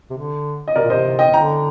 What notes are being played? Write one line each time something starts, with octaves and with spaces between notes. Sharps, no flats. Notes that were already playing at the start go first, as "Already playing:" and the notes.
C3
D3
D#5
C3 A#4 D5
A#2
C3 C5 D#5
D#5 G5
D3 G5 A#5